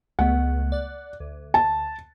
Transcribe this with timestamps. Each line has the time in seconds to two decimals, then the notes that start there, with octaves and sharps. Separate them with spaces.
0.19 C#2 A3 B3 F#5
0.72 D5 F#6
1.20 D2
1.54 A5